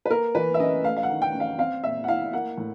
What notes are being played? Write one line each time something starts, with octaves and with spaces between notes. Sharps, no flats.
B4
A#3 A#4
E3 B4
E5
C#4 D#5
A3 F5
F5
F#5
D#3
G5
C#4
F5
C4 F5
A#2 E5
F#5
E4 F5
A#3 F#5
A2